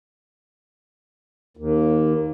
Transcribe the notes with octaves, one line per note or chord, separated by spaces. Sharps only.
D#2